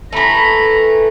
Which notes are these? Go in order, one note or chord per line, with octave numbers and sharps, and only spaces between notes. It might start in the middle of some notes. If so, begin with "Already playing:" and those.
E3 A3 A#5 B5